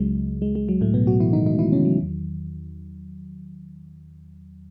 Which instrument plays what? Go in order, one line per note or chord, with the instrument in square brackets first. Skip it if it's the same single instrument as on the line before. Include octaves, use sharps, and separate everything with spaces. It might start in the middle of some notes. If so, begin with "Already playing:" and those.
Already playing: [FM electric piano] C#2 C#3 F#3 G#3
G#3
G#3
F#3
A2 A3
B2 B3
F#3 F#4
E3 E4
D#3 D#4
D#3 D#4
E3 E4
C#3 C#4
F#3
E2 D#3 F#3